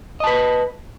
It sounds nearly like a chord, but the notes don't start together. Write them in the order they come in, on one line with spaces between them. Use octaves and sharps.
D#5 A5 B4